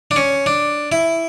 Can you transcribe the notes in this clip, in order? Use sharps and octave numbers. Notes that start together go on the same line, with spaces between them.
D4
C#4
D4
E4